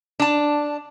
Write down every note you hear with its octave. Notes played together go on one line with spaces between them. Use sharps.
D4 A5